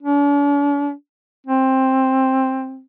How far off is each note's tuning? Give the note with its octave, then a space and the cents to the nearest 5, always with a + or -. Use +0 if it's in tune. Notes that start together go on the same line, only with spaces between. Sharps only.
D4 -45
C4 +10